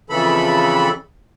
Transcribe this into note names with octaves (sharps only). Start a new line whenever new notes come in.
F2 C#3 E3 A4 B5